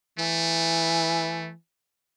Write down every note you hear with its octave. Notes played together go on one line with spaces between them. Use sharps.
E3 A3